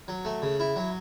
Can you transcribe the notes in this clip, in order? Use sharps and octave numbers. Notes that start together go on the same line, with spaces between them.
F#3
A3
C#3
E4
F#3